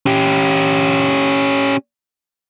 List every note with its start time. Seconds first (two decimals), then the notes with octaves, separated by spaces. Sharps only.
0.06 C#4 G4